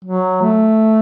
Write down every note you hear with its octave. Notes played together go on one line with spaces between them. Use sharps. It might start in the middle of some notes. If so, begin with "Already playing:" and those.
F#3
A3